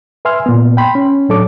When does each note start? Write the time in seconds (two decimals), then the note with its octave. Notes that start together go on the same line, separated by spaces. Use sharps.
0.25 B4 E5 G#5 C6 E6 F6
0.46 A#2 B3
0.77 G5 B5 C6
0.95 C#4
1.29 A2 F#3 D4 A4 C#5 D6